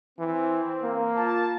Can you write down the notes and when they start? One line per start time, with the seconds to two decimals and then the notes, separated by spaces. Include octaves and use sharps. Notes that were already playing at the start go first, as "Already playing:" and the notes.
0.19 E3 C4
0.83 A#3
1.16 F4 A5